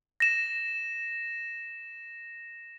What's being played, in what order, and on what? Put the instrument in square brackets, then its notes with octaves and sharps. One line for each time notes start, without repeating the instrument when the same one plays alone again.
[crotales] A#6 E7